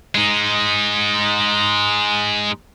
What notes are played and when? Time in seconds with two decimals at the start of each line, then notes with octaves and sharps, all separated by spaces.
0.15 G#3 D#4